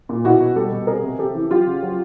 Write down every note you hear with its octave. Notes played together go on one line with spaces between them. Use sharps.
A#2
B2 E4 F#4
B2
G3 G4 A4
B2
C3 G#4 A#4
C3
C3 G4 A4
E3
F#3 F4 G4
C#3
F#3